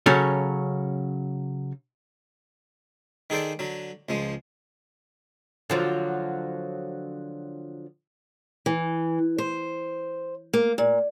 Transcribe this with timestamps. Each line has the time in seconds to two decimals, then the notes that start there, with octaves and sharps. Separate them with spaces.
0.06 C#3 F#3 C#4 A4 C#5
3.30 D#3 G#4 A4 C5 D5
3.59 D3 F#3
4.09 C#2 F3 G#3
5.70 D3 F3 F#3
8.66 E3
9.38 C5
10.53 A#3
10.78 A#2